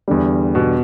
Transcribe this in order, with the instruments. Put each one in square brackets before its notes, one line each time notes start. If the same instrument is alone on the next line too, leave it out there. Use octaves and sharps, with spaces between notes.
[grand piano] E2 D3 G3
[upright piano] B2